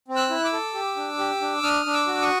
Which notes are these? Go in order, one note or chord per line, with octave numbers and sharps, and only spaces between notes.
C4
E6 F#6
E4
D6 E6
A4
G4
D4
G4
D4
D4 D#6 F6
D4
D6 E6
F#4
C#6 D#6